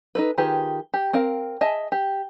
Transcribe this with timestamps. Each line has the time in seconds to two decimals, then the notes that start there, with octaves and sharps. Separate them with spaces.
0.15 D#4 A4 B4
0.38 D#3 F4 G4 G#4 B4
0.94 G4
1.13 C4 A#4 F5
1.61 G#4 D#5 E5 G#5 A5
1.92 G4